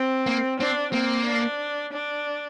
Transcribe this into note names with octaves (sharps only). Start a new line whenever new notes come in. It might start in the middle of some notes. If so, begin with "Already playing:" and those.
Already playing: C4
A#3
C4 D4
A#3 C4
D4
D4